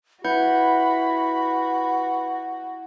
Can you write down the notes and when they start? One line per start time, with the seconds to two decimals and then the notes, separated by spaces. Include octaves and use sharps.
0.24 E4 F#4 B4 F#5 B5 G6